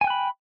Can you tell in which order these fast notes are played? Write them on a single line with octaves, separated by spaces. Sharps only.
G#5 G5 F#6 B5